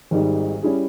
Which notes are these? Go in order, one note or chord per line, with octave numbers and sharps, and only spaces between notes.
G#1 G#2 D#3 G3
G3 C#4 E4 G#4